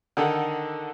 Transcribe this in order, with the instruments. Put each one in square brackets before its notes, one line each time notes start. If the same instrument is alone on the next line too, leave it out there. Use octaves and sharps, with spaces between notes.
[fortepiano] D3 D#3 D#4 A4 F#5